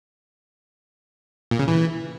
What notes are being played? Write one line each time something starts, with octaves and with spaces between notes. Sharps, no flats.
A#2
C#3
E3